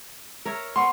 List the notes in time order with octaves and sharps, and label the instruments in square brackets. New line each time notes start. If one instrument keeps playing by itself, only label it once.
[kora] A#4 C#5 E5
[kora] B3 [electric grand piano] C6 C#6